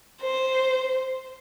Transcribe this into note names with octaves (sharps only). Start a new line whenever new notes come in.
C5